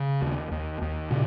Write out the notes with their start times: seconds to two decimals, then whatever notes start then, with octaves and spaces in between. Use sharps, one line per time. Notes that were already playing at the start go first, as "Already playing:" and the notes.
Already playing: C#3
0.22 D#2
0.51 D#2
0.82 D#2
1.11 A#2 C#3